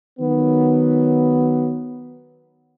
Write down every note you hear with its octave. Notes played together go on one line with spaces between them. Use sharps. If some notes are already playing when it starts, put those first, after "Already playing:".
D#3 F#3 B3